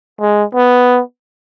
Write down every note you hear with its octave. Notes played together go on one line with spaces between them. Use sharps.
G#3
B3